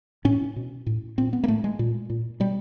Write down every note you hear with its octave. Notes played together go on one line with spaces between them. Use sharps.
A2 C#4
B2
A2
A#2 C4
B3
A#3
A2 A3
G#3
A#2
A#2
B2 G3